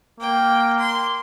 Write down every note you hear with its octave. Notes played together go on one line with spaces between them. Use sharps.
A#3 G5
C6